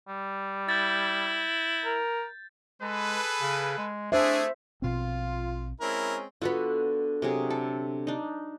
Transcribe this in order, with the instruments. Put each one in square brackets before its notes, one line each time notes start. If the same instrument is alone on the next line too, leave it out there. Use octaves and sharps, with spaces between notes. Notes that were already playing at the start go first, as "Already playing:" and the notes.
[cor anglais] G3
[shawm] E4 [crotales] G6 A6
[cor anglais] A#4
[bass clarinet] G#3 [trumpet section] G#4 A4 B4
[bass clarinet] C#3
G#3
[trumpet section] A3 G#4 [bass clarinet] D4 [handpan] C5 E5
[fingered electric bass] A#1 B2 C4 [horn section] F4
[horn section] G#3 C4 C#4 [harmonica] E4 A#4
[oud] D3 B3 [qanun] F4 F#4 B5
[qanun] C3 F#3 G#4
A4
D4 D#4